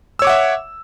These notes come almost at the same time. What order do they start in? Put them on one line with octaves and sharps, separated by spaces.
E6 C#5 D6 F#5 E5